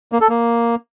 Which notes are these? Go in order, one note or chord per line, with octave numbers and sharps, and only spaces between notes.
A#3
A4
A#3